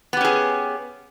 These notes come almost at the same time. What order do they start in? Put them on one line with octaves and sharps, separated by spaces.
B3 G4 C#4 G#4